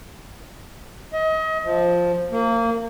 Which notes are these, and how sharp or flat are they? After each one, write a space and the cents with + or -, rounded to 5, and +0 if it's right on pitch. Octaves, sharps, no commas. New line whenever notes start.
D#5 +30
F3 +5
A#3 -25